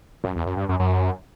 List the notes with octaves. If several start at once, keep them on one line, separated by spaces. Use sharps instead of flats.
F#2
E2
F#2
G2
F#2
F#2